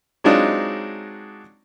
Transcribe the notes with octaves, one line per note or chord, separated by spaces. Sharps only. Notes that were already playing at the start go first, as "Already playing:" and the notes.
F#3 G#3 C4 D4 D#4 F4